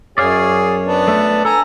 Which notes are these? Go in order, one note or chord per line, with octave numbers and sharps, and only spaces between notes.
F#2 G#4 C#5 D5 F5
B3 D4
A3
A4 G#5 A#5